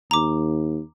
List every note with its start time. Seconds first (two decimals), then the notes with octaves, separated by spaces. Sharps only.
0.11 D#2 A#5 D6